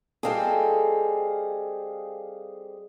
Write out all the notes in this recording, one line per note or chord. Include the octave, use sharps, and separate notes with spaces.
G3 C4 G#4 A4 D#5 F5